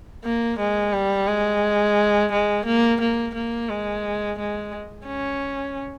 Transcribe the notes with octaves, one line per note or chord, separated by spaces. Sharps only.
A#3
G#3
G3
G#3
G#3
A#3
A#3
A#3
G#3
G#3
C#4